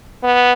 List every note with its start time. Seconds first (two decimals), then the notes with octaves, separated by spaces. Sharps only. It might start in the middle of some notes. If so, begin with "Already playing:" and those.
0.24 B3